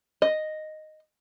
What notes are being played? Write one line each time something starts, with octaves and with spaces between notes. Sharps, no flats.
D#5